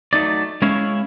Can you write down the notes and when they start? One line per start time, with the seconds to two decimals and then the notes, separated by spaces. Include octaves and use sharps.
0.13 F#3 A3 D#4 D5
0.62 G#3 C#4 E4 C#5 F5